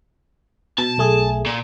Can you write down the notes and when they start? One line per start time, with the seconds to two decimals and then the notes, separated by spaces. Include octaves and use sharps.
0.78 B2 A5
0.98 B1 A3 G#4
1.46 A#2